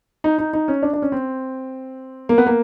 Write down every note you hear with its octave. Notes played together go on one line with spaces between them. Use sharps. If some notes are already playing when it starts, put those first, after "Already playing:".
D#4
D#4
D#4
C#4
D4
D4
C#4
C4
A#3
B3
A#3